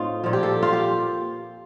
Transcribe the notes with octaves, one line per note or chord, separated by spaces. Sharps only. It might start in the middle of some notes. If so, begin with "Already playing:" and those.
Already playing: A2 C4 D#4 F4
A#2 F3
G4
A4
F4
G4